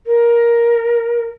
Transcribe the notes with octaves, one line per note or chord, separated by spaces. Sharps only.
A#4